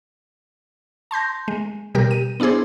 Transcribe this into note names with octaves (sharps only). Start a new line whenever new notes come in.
A5 C6 G6 A#6
G#3
B2 G3 G4 A#4
D#7
B3 D4 E4 G#4 C5